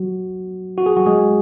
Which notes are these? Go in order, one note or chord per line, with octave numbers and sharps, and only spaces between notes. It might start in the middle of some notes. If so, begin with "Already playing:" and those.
Already playing: F#3 F#4
F#4
G#4
F#3 F#4
G#3 G#4